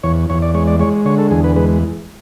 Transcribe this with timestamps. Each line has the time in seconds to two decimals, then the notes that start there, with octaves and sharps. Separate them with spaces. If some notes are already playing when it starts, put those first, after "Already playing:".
0.03 E2 C#5
0.30 E2 C#5
0.42 D5
0.54 G#3 C#5
0.67 D5
0.80 G#3 C#5
1.05 D3 C#5
1.18 A4
1.31 E2 G#4
1.44 B4
1.56 G#3 B4